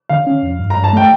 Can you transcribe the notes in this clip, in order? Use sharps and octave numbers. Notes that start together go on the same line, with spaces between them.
D3 F5
C#4
F2
G2
A#5
G2
A5
A3 G5